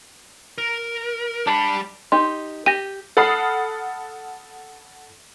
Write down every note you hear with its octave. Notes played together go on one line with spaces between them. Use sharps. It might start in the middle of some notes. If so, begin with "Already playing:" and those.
A#4
G3 D4 F#5 B5
D#4 G4 C6
G4 A#6 D#7
A4 F#5 B5 D#6 F6 C7